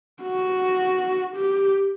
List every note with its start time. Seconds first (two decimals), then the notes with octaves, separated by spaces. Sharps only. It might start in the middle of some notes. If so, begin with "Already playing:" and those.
0.22 F#4
1.35 G4